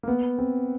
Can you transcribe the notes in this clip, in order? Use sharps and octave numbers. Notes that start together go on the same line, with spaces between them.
A#3
B3
C4